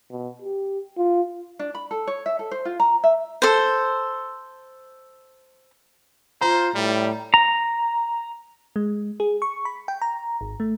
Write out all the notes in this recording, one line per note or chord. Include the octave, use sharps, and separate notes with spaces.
B2
G4
F4
D4
B5
A4
C#5
E5
A4
C5
F4
A#5
E5
A4 C5
F4 C5 A#5
A2 G3 D5
A#5
G#3
G#4
C#6
B5
G5
A#5
G#1
A3